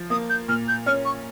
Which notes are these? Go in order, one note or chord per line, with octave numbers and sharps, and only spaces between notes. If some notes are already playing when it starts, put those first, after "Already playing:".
Already playing: F3
A#3 D#6
G6
A#2 F6
G6
C#4 F6
C#6